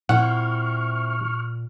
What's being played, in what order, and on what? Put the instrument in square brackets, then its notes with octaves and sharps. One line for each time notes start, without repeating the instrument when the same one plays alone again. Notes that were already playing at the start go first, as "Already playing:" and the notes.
[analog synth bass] A#2 [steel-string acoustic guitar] C4 E4 [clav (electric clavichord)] F#5 [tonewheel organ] C#6 F6